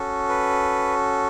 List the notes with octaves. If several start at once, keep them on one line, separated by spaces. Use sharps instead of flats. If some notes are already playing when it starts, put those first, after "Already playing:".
Already playing: C#4 F#4 A4
B4